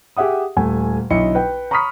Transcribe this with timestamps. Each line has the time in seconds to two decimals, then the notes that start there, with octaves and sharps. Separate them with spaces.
0.17 G4 G#4 E5 F#5 D#6
0.57 D#1 A3 G#5
1.10 B1 D3 E4 D#5 C#7
1.35 B4 G5
1.71 A#5 B5 C#6 D#6 F6 B6